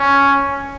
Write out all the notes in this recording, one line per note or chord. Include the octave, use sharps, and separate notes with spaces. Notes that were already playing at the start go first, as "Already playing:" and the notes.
Already playing: C#4